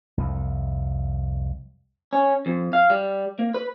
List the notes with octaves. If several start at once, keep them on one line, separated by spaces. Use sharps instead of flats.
C2 F2
C#4
F2
F5
G3
A#3
B4